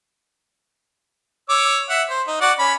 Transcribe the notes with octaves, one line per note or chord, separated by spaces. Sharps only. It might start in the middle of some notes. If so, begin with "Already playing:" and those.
C#5 D6 E6
E5 F#5
C5
D#4
F#4 D5 F#5
C#4 B5